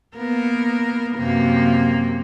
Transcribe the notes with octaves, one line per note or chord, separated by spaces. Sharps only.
A#3 B3 A#4
F#2 C3 A#3